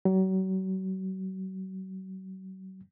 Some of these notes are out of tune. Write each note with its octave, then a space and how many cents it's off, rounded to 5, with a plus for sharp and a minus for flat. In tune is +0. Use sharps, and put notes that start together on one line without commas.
F#3 +35